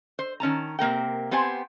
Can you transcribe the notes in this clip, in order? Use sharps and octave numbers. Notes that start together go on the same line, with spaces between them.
C5
D#3 C#4 A5 A#5
C3 A#3 A#4 G5
B3 C4 G4 C5 G#5 A5